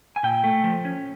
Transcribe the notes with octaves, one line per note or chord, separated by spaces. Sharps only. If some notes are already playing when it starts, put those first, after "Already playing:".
G#5
A#2 G5
A3
F3
C#4